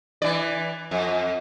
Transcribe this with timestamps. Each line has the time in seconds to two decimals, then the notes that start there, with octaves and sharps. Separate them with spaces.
0.22 E3 D5
0.91 F2